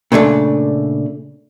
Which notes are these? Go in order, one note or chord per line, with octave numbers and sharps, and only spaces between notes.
A#2 C#3 A3 D4